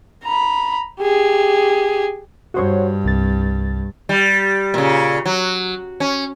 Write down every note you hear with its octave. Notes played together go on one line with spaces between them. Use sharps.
A#5 B5
G4 G#4
G2 F#4 C5 C#5
C2 A6
G3
A#2 C#3
F#3
C#4